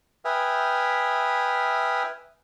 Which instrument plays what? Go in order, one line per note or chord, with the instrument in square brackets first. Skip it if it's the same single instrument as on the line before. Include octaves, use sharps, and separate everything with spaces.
[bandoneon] B4 E5 G5 G#5 D#6 F6